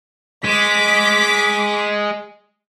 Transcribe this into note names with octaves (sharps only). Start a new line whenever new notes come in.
G#3 D6 B6